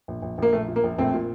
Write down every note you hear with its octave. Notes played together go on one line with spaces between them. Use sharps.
A#1
A#1
A#1 A#3
A#1 A3
A#2
A#3
A#1
A#1 A3 C4
A#2